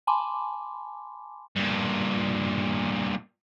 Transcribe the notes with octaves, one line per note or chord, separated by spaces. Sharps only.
G#5 A5 B5 C6 D6
G2 A#2